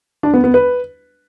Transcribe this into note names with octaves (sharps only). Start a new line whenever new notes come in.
D4
B3
B3
B4